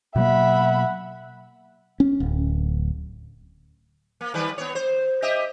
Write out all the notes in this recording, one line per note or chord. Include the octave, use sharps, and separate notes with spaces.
B2 F#3 A#3 E5 F#5 B5
C#4
D1
A#3
D#3 G3 B4
B3 C#5
C5
G4 D#5 E5